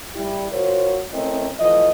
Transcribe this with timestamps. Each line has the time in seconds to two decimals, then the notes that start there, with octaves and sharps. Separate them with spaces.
0.15 G3 E4 G4
0.52 F4 F#4 A#4 C5 C#5
1.13 A3 C4 C#4 E4 A#4 D#5
1.59 E3 F3 A3 D#5